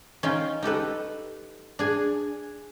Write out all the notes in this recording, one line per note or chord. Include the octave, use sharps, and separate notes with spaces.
C#4 D#4 F4 G5
D#4 G4 A4 B4
D4 G#4 G#5